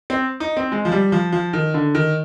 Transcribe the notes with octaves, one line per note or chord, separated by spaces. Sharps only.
C4
D#4
C4
G#3
F3
G3
F3
F3
D#3
D3
D#3